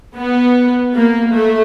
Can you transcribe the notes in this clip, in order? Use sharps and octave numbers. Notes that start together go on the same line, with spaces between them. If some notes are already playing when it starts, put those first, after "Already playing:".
B3
A#3
A3